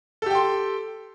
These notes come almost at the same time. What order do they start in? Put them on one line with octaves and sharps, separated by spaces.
A4 G4 G5 C6